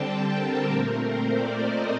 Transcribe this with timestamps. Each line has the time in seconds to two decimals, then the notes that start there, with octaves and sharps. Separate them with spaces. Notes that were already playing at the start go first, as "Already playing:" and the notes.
Already playing: D3 G3 C4 G5 A5
0.34 A#4
0.65 A#2 A3 C4
0.95 C5
1.27 D5
1.57 D#5